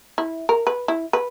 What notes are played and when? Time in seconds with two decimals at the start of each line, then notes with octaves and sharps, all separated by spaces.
0.18 E4
0.49 A#4
0.67 B4
0.88 E4
1.13 B4